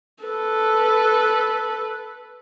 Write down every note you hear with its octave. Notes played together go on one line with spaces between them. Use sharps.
A4 B4